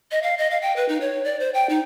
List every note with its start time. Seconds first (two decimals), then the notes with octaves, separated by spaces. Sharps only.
0.11 D#5
0.23 F5
0.38 D#5
0.50 F5
0.62 G5
0.76 B4
0.89 D#4
1.01 C#5
1.24 D5
1.40 C5
1.54 G5
1.70 D#4